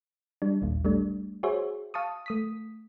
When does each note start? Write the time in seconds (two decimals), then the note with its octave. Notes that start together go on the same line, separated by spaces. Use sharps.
0.42 G3 D4
0.62 A1 D#2 A#2
0.85 G3 A3 D4
1.43 F#4 G#4 C5 C#5 E5
1.94 F5 A5 C#6 D#6
2.26 A3 D#6 B6